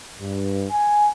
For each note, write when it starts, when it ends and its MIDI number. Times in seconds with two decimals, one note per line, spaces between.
0.21 0.65 43
0.71 1.09 80